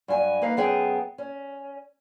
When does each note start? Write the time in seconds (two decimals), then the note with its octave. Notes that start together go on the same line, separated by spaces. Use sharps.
0.08 G2 F#3 G#5
0.42 A#3 D#4 B4 F5
0.57 F#2 B3 G#4 G5
1.18 C#4